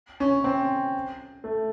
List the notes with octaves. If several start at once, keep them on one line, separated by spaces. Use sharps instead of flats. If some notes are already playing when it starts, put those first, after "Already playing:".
C#4
C4
A3